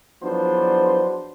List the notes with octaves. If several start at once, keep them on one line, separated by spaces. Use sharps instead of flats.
E2 F3 F#3 B3 D4 C5